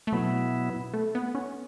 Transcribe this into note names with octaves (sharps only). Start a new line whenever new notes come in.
A3
B2 F#3 B3 E4
A3
B3
C#4